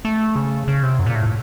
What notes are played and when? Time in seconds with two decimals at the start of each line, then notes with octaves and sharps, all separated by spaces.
0.05 A3
0.36 C#3
0.68 C#3
0.83 C3
0.99 F#2
1.06 A#2
1.15 A2